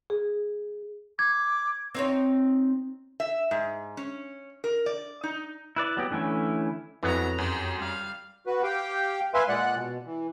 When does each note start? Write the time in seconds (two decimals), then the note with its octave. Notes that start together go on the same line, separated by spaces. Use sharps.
0.10 G#4
1.19 D6 G#6
1.95 C4 D#4 C#5
3.20 E5
3.51 G#2
3.97 C#4
4.64 A#4
4.86 D5
5.23 D#4
5.76 E4 B4 D5
5.97 F#3 B3 G4
6.11 D3 E3 A3 C#4 E4
7.03 F2 E3 F#3 B3 A#5
7.38 F#2 G4 C6
7.77 G3 F5
8.46 F#4 B4
8.63 G4 F5 G5
9.34 B4 E5 F5 G#5 C6
9.48 A#2 G#3 D5 F#5 F#6
9.75 B2
10.06 E3